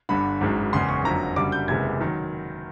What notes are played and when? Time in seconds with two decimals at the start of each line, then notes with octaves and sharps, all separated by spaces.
0.09 G1 G2 D3 B5
0.41 G#1 F#2 D#3 G#3
0.73 F#1 E2 C#3 C6
0.89 C#6
1.04 F#1 F2 D3 F#3 A#5
1.36 F#1 F#2 D3 G3 D6
1.52 G6
1.68 F#1 E2 C3 E3 G#3 G#6
2.01 D#3 F#3